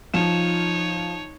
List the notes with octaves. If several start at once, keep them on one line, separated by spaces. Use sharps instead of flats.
F3 D#4 F4 C#5 E7